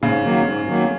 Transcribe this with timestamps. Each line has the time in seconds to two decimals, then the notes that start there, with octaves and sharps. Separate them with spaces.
0.02 G#2 C#3
0.24 D#3 F#3 A#3
0.45 G#2
0.67 D#3 F#3 A#3